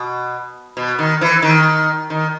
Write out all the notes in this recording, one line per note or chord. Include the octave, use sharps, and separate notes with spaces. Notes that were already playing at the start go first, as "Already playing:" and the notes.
Already playing: B2
B2
D#3
E3
D#3
D#3